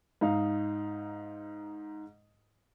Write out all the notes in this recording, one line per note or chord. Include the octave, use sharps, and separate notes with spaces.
G#2 D#4 F5